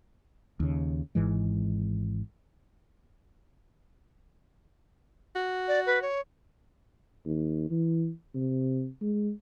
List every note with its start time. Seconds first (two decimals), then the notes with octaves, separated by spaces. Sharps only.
0.60 D#2 C#3
1.15 G#1 G#2 E3 G#3
5.35 F#4
5.68 D5
5.86 B4
6.02 C#5
7.25 D#2
7.70 E3
8.34 C3
9.01 G#3